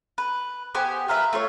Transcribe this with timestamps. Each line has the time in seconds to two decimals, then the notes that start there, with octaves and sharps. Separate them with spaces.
0.18 B4
0.75 B3 G4 C5 G#5
1.08 F4 A#4 B4 E5
1.33 A3 F4 C#5